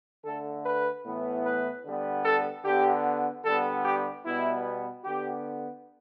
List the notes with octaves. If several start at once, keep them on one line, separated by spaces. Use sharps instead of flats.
D3 A3 A4
B4
A2 E3 B3
B4
D3 G3 B3
A4
D3 B3 G4
D3 G3 B3 A4
G4
B2 G3 B3 E4
D3 B3 G4